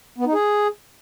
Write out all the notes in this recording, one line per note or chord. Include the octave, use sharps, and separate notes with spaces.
B3
D#4
G#4